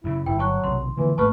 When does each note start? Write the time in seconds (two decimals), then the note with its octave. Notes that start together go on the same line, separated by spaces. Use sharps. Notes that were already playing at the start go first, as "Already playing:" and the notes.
0.04 F#2 C#3 E4
0.26 G1 E4 G5
0.39 F#3 A5 C#6 F#6
0.64 B1 C3 D#3 C6
0.97 D3 E3 F3 A#3
1.18 G#1 A3 A#3 B4 A5 C#6 F6